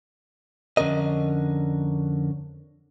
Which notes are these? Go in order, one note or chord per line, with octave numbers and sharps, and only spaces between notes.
F2 D3 C#4 D4 A#4 D#5